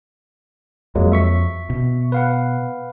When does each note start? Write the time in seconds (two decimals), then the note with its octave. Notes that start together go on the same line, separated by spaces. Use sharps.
0.95 F2 F#3 G#3 A#3
1.12 E5 C#6 B6
1.70 B2
2.12 B4 F5 F#5